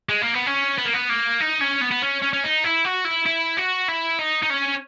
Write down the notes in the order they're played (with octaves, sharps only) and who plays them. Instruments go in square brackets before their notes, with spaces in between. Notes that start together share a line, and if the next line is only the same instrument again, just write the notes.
[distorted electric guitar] G#3
A#3
B3
C#4
B3
A#3
B3
A#3
D#4
C#4
B3
B3
C#4
C#4
C#4
D#4
E4
F#4
E4
E4
F#4
E4
D#4
D#4
C#4